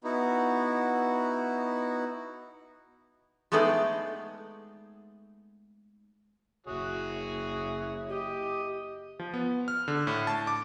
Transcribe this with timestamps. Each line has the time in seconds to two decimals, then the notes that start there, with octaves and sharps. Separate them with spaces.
0.04 B3 D#4 E4 F#4
3.52 G#3 A3 B3 D#4 G#4 D5
6.67 F#1 E4 F#4 G#4 C#5
8.09 G4 D#5
9.19 F3
9.34 B3
9.68 F6
9.88 D3
10.07 A2
10.27 A5
10.47 D6